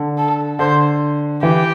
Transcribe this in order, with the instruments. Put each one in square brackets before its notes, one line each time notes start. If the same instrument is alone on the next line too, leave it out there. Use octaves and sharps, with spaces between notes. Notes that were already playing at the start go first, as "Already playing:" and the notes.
Already playing: [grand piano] D3
[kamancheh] A4
[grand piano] D3 [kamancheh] C5
[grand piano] E3 [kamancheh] G4